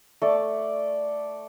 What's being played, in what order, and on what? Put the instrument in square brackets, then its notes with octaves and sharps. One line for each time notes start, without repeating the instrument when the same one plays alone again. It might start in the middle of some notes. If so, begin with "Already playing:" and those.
[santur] A3 D5